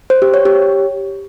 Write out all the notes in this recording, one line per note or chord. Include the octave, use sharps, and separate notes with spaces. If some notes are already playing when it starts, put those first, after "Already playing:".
C5
G4
C#5
G4